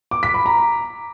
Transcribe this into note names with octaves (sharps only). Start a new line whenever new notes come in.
D6
B6
B5
A#5